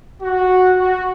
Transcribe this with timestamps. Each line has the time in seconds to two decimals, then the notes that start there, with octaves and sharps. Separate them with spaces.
0.22 F#4
0.78 F#4